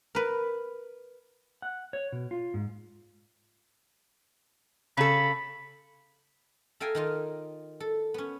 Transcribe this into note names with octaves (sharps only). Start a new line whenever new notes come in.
A#4 B4
F#5
C#5
B2
F4
G#2
C#3 A4 B5
A4 E5 F5 G5 G#5 A#5
D#3 D#4 F4
A4
B3 C#4